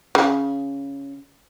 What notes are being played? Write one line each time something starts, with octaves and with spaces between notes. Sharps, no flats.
C#3